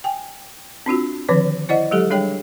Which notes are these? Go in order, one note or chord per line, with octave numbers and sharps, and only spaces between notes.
G5 G#5
C4 D4 F4 F#4
D3 D#3 F3 C4 B4 C#5
E4 C5 D5 D#5 F#5
F#3 G#3 G4 A4
G3 D4 G#4 C#5 G5